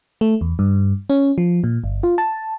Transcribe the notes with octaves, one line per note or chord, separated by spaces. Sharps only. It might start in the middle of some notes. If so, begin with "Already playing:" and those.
A3
E2
G2
C#4
F3
A#2
G1
F4
A5